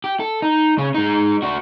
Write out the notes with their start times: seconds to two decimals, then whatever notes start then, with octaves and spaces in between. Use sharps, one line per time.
0.04 G4
0.20 A4
0.42 D#4
0.78 C#3 C#4
0.94 G#3 D#4
1.42 D4 F#4